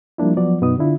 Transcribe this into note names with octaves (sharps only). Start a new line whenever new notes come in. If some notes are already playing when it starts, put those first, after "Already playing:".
F3 G3 A#3 D4 E4
F3 F#3 B3 F#4 D5
F#2 B2 B3 D#4 F#4 D#6
D3 D4 E4 F4